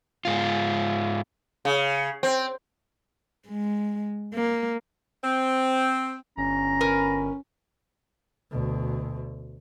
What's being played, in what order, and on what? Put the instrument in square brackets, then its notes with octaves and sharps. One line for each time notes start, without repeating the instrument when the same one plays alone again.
[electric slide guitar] G#2 F4
[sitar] C#3
C4
[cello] G#3
A#3
[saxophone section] C4
[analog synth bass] G1 [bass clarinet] C#4 [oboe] A#5
[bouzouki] A#4 B4 G#5
[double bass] D2 B2